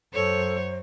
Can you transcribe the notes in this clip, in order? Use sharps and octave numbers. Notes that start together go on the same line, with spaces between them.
F#2 A4 C5 C#5